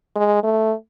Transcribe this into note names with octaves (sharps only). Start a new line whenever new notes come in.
G#3
A3